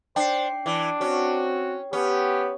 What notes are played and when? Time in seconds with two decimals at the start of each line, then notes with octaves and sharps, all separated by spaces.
0.16 D4 C5 G5 C7
0.66 E3 D4
1.01 C4 C#4 F#4
1.93 B3 C#4 G4